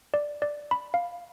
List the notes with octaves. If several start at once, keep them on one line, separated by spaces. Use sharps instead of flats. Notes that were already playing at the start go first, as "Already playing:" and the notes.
D5
D5
B5
F5